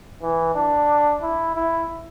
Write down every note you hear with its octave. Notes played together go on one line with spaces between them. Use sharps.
E3
D4
E4
E4